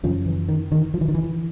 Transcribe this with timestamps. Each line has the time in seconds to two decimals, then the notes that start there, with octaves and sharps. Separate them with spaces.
0.03 F#2 C#3 F3
0.26 E3
0.49 D#3
0.72 D#3
0.94 F3
1.01 E3
1.08 D#3
1.14 E3